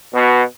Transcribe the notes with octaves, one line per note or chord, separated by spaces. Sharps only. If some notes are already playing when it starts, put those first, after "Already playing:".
B2